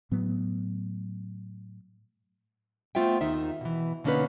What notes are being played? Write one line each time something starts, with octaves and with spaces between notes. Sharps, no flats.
A2 F#3 B3
A3 B3 F4 C5 E5 G5
D#2 D#3 D#4 E5
B2 E3
B2 D3 A#3 C#4 D#4 B4